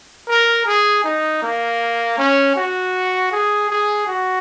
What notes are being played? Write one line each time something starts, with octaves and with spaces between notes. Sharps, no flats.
A#4
G#4
D#4
A#3
C#4
F#4
G#4
G#4
F#4